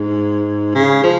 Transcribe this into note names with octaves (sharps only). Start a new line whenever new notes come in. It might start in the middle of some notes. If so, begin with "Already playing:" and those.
Already playing: G#2
C#3
F3